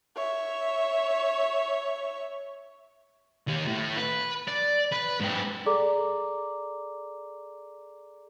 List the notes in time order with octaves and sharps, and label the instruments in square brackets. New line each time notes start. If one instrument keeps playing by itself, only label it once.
[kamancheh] C#5 E5
[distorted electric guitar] D#3 G4
A2
B4
D5
B4
G#2 G4
[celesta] G#4 A4 D5 A#5 D6